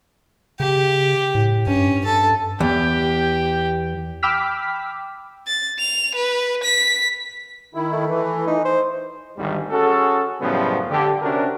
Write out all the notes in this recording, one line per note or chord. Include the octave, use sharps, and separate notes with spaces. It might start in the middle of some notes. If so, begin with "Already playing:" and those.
C#3 G4
A2
G2 C#4
A4
E2 G4
G5 B5 D6 E6 F6 B6
A6
F7
B4
B6
D#3 E4
A3
E3
D#4
C5
G#1 D2 G3
C#4 F#4 G#4 A4
F#2 A2 C#3 F3 G3 B3
D3 G4
C3 C#4 D4 F#4 A#4